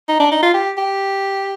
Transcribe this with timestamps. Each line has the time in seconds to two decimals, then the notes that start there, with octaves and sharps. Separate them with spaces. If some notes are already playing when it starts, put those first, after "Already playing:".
0.08 D#4
0.20 D4
0.31 D#4
0.42 F4
0.54 G4
0.77 G4